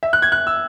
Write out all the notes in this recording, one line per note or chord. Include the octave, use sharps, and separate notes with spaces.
E5
F#6
G#6
F#6
E6